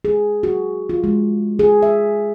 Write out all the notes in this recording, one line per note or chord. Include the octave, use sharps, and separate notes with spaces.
G#4
F#4
F4
G#3
G#4
E5